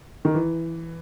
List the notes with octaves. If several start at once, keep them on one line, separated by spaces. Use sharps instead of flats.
D#3
E3